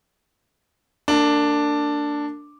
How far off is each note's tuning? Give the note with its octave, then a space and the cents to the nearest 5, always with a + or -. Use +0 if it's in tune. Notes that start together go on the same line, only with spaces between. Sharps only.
A#3 -40 D4 +0 A#4 -40